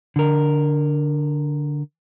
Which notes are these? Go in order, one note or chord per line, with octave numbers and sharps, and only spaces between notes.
D3 A#4